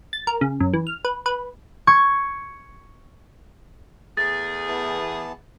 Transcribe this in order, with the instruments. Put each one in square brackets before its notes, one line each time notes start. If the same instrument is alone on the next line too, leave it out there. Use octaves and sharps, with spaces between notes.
[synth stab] A6
A#4
C#3
F#2
E3
F6
B4
B4
[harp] C#6 G#6
[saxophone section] E2 A3 G#4 [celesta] A6
[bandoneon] E3 B3 A5